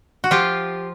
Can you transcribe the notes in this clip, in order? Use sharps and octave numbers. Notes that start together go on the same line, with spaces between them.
F#4
F3 F4 G4